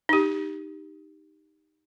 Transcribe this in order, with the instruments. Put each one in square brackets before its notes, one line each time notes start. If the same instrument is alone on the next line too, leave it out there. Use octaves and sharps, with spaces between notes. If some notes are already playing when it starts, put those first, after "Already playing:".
[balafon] D#4 G4